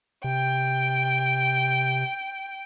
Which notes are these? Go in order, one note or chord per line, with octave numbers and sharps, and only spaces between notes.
C3 G5